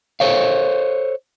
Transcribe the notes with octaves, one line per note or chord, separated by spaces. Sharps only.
A4 C5 C#5 F5